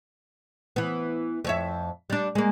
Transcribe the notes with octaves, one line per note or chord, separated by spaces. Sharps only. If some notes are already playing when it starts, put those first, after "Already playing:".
E3 B3
F2 C#5 E5
G3 D4
G#3 A#3